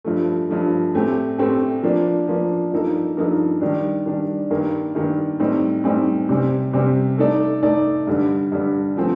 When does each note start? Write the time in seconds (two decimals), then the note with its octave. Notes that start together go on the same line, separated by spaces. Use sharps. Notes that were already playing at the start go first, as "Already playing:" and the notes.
0.05 G2 F3 A3
0.49 G2 F3 A3
0.94 A2 A3 C4 G4
1.38 A2 A3 C4 G4
1.83 F3 A#3 D4
2.28 F3 A#3 D4
2.72 G2 F3 A#3 D#4 A4
3.17 G2 F3 A#3 D#4 A4
3.61 D#3 G3 D4
4.06 D#3 G3 D4
4.51 G2 D#3 A#3
4.95 G2 D#3 A#3
5.40 A2 G3 C4 D#4
5.84 A2 G3 C4 D#4
6.29 C3 G3 C4
6.73 C3 G3 C4
7.18 A3 D#4 A4 D5
7.62 A3 D#4 A4 D5
8.07 G2 D3 G3
8.52 G2 D3 G3
8.96 D3 F3 A3 C4